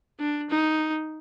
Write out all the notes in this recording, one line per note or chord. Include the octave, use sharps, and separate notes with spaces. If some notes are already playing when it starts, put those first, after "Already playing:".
D4
D#4